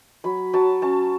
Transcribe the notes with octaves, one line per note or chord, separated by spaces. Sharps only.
F#3 B5
F#3 A5
C#4 A5